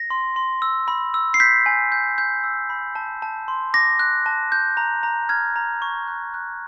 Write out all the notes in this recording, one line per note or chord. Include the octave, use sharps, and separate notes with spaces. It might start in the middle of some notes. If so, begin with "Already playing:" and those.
Already playing: A#6
C6
C6
E6
B5
E6
C7
G6 B6
G#5
G6
G6
E6
B5
A5
A5
C6
D6 A#6
F#6
A5
G6
A#5
A#5
F6 G#6
A#5
C#6
F#6
F#6